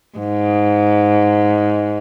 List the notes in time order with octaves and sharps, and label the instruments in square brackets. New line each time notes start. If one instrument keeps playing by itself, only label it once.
[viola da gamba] G#2